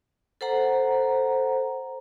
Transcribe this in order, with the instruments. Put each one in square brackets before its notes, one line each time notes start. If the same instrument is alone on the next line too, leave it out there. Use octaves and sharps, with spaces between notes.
[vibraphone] A4 C5 F#5 A#5